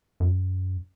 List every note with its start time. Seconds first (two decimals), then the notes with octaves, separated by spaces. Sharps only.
0.20 F#2